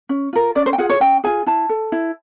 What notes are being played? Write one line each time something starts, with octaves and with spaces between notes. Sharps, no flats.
C#4
F4 A#4
C#4 D5
C5
G5
F4 G#4 F#5
C#5
C#4 G5
F4 G#4 G#5
E4 A5
A4
E4